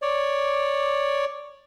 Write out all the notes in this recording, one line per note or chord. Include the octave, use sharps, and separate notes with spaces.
C#5 D5